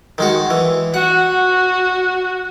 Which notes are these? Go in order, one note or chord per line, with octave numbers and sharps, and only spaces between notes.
D#3 G#3 F#4
E3
F#4 F#5